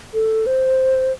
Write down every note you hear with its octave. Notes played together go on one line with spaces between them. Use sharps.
A4
C5